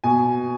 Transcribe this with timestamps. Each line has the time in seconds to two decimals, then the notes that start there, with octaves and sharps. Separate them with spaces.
0.04 B2 G#5